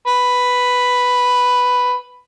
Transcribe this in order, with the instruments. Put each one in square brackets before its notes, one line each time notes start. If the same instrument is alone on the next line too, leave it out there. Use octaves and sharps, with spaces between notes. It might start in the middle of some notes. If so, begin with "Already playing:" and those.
[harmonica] B4